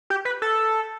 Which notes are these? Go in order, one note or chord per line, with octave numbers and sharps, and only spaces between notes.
G4
B4
A4